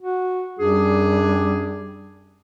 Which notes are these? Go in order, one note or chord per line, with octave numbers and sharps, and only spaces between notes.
F#4
F#2 G3 D4 G#4